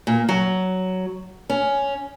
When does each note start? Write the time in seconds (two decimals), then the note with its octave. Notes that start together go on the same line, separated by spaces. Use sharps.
0.07 A#2
0.29 F#3
1.50 C#4